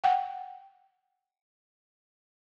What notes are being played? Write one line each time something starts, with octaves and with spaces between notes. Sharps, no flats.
F#5 G5